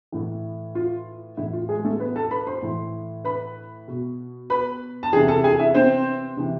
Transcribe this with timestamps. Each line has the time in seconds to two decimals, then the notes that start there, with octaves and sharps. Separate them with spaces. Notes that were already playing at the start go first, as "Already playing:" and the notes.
0.12 A2 E3
0.75 F4
1.37 A2 E3 E4
1.53 F4
1.69 G#3 G#4
1.84 A3 A4
2.00 B3 B4
2.16 A4 A5
2.31 B4 B5
2.47 C5 C6
2.63 A2 E3
3.24 B4 B5
3.88 B2
4.50 B4 B5
5.03 A5
5.13 E3 G#4 G#5
5.16 C3
5.28 A4 A5
5.44 G#4 G#5
5.59 E4 E5
5.75 C4 C5
6.37 C3 E3